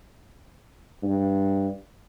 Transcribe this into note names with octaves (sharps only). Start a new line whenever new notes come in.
G2